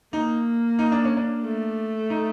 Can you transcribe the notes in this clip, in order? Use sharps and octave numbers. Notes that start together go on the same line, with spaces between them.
A#3 D#4
D#4
D4
C#4
D4
A3
D#4